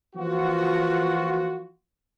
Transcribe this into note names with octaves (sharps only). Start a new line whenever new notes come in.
E3 F3 A#3 F4 F#4